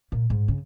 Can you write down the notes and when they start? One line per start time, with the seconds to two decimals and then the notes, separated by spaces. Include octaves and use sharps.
0.12 A#2
0.30 G#2
0.48 C#3